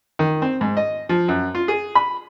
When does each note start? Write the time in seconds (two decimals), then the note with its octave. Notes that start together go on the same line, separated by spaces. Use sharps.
0.19 D#3
0.42 C4
0.61 G#2
0.77 D#5
1.09 F3
1.28 F#2
1.55 F4
1.68 G#4
1.95 B5